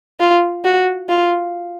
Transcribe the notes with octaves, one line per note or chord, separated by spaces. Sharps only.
F4
F#4
F4